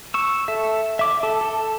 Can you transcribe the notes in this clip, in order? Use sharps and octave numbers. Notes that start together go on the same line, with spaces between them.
C#6 E6
A4 E5
E5 D6
A4
A4